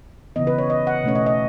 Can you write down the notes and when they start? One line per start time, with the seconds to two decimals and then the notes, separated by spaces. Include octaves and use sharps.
0.36 C#3 E3 B3 D#5
0.47 B4
0.58 C#5
0.70 D#5
0.87 F#5
1.04 B2 A3 C#4 C#5
1.15 D#5
1.26 D#5